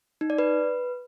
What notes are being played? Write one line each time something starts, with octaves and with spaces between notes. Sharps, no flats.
D#4
D5
B4